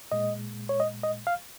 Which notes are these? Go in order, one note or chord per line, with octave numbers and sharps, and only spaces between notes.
A#2 G#3 D#5
C#5
D#5
D#5
F5